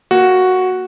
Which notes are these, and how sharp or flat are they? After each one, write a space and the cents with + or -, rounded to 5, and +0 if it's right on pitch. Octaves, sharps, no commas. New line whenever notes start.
A#3 +0 F#4 +0